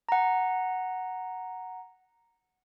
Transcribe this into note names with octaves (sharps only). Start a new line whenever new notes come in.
F#5 A#5